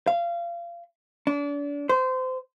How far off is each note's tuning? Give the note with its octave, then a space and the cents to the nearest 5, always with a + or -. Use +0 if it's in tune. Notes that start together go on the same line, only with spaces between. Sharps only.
F5 -25
D4 -35
C5 -25